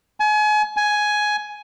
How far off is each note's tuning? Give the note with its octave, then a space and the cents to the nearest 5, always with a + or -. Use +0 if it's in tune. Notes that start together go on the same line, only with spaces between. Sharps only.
G#5 +35
G#5 +10